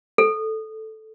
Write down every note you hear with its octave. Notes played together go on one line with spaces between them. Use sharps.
A4